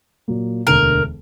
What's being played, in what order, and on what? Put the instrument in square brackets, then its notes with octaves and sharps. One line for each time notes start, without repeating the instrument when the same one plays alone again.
[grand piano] A#2 F#3 A#3
[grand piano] E1 D2 D3 [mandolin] A#4